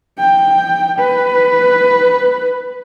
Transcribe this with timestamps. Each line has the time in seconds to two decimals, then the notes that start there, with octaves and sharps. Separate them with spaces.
0.19 G5
0.99 B4